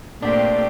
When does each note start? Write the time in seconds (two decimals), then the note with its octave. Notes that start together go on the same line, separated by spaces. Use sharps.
0.22 A#2 A3 C4 D4 G4